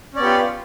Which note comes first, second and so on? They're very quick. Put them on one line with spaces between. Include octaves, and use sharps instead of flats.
C#4 D5 B3 G4 F4